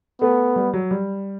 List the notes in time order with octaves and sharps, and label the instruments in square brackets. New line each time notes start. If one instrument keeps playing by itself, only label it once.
[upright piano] A3 [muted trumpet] B3
[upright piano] G3
F#3
G3